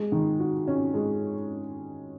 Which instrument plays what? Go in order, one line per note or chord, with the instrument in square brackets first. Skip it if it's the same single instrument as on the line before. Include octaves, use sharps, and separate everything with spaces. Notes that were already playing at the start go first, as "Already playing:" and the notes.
Already playing: [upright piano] G#3
D#3
F#4
C#4
G#3